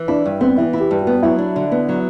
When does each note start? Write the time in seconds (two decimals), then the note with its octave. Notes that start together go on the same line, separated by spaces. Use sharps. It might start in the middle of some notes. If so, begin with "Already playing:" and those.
Already playing: E3
0.08 D4 E4
0.26 G2
0.41 B3 C4
0.57 E3 E4
0.73 E4
0.80 G4
0.91 G2
1.01 F#4
1.07 B3
1.22 F#3 E4
1.39 D4
1.56 D3
1.72 B3
1.89 F#3